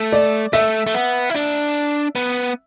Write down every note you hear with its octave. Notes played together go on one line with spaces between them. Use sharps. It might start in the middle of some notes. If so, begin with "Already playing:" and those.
Already playing: A3
D5
A3 E5
A3
B3
E4
D4
B3